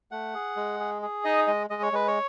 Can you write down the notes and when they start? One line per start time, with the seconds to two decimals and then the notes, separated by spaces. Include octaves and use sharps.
0.11 A3 F#5
0.34 G#4
0.56 G#3
0.80 G#4
1.02 G#4
1.24 D#4 D#5
1.47 G#3 D#5
1.70 G#3 D#5
1.82 C#5
1.93 G#3 B4
2.08 C#5